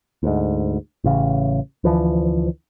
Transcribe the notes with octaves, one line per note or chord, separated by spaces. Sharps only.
D2 G#2
A1 C#3
D2 E3 F3